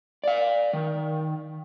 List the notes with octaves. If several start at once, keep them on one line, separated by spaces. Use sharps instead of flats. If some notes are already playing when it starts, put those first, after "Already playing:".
D5 F5
D#3